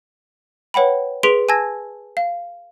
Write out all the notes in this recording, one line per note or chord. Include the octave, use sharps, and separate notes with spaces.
B4 C#5 F#5 G5 B5
G#4 B4 C6 B6 D7 F7
G#5 A5 E6 G#6 A#6
F5